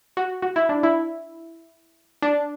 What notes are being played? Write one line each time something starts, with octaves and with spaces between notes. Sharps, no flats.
F#4
F#4
E4
D4
E4
D4